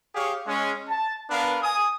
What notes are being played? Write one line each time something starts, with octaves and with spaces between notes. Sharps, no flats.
G4 G#4 C#5 F5
G#3 C#4
A5
B3 D4 A#4 B4 F5
G#5 D#6